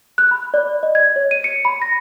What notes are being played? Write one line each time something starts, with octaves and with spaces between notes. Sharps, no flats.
F#6
B5
D5
D#5
G#6
C#5
D#7
C#7
B5
A#6